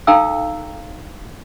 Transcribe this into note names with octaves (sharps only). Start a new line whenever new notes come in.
D#4 A4 F5 G5 A#5 E6